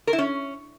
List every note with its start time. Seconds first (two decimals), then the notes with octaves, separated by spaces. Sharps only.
0.07 A#4
0.13 E4
0.18 C#4